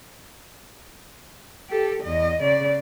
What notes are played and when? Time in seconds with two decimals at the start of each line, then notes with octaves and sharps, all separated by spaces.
1.69 G4 A4
2.04 E2 D#5
2.43 C#3 D5